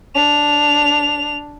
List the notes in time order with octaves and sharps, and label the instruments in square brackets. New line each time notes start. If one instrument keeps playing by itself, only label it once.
[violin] D4 F7